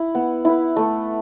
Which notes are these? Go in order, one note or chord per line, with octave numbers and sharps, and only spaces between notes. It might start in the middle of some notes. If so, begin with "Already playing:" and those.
Already playing: E4
B3
E4 B4
A3